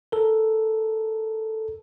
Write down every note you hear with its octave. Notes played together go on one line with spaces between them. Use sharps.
A4 A#4